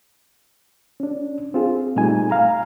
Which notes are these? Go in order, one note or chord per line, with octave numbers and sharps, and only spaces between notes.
C#4 D4
C4 F4 G#4
A#2 G3 A3 D#4 G#5
F5 A#5